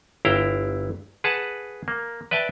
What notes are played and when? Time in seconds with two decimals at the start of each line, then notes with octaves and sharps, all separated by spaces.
0.25 G1 E4 F5 G5 A#5
1.24 G#4 B4 F#5 A5
1.88 A#3
2.31 B4 D5 E5 G5 A5